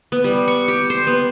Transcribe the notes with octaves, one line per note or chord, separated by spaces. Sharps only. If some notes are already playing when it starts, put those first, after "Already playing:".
B3
G3
C#6
G4
C5
B3